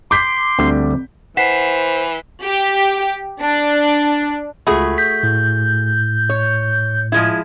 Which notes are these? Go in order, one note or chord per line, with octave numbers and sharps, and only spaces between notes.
C6 D6 G6 B6
D2 D3 G3 C4
E3 C5 F#5 B6 C7 E7
G4
D4
C#2 A3 F4 F#4 G#4 B5
G6 B6
A2
C#5
F3 G#3 E4